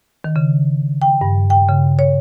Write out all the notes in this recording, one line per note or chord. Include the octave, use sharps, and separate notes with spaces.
D#3
C#3
G5
G2
G5
C#3
C#5